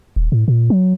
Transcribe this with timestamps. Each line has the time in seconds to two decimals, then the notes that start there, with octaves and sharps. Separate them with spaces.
0.16 D#1
0.32 A2
0.48 A#2
0.70 F#3